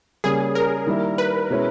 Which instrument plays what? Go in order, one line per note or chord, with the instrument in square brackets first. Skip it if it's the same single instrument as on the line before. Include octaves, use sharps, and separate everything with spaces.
[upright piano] C#3 G3 A#3 C#4 [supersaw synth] G#4
[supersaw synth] A#4
[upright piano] D#3 G3 A#3 E4
[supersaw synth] B4
[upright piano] B2 G#3 C#4 E4